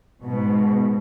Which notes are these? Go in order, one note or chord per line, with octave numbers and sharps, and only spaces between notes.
G#2 B2